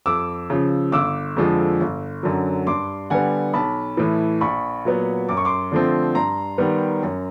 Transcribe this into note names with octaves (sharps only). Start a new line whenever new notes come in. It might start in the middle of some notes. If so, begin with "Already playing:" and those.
F2 D6 E6
C#3 F3
G1 D6 E6
F2 D3 F3 G#3
G1
F#2 D3 F#3
G2 C6 D6
D3 G3 B3 F#5 G#5
B1 A5 B5
A2 E3
A#1 B5 C#6
A#2 F#3 B3
F#2 D6
C#6
C6 D6
D3 F3 A3 C4
G2 A#5 C6
D#3 G3 B3
F#2